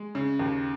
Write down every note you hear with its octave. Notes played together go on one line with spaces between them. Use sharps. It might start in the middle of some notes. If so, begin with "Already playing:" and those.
Already playing: G#3
C#3
D#2